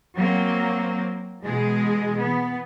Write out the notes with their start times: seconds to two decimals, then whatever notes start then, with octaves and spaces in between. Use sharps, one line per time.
0.17 F#3 A#3 C4
1.43 B2 E3 G#3 G#4
2.22 E3 B3